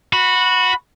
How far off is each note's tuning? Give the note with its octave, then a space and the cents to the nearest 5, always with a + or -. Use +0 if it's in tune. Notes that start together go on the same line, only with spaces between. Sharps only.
F#4 -15 B5 +0